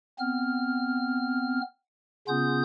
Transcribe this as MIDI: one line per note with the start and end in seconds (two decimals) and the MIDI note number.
0.19 1.61 59
0.19 1.61 60
0.19 1.61 89
2.28 2.63 49
2.28 2.63 59
2.28 2.63 61
2.28 2.63 65
2.28 2.63 87
2.28 2.63 91